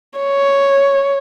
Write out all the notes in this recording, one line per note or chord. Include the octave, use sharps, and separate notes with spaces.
C#5